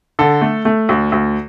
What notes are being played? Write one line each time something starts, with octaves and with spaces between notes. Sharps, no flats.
D3 A4
A3
A3
D2
D2